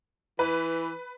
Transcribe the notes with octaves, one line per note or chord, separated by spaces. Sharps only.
E3 B4